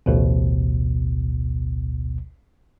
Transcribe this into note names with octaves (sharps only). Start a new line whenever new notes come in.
A1 D2 B2